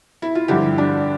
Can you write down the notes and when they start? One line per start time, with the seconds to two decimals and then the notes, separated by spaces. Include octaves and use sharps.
0.22 E4
0.35 F4
0.48 G2 D3 F3 E4 G4
0.78 D4